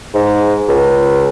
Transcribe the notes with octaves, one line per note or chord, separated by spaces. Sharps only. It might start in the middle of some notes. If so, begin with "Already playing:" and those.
G#2
C#2